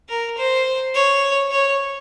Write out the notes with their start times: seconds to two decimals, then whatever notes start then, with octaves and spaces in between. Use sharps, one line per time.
0.09 A#4
0.37 C5
0.94 C#5
1.51 C#5